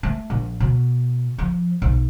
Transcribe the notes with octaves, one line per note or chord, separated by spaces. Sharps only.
A3
A#1
B2
F3
B1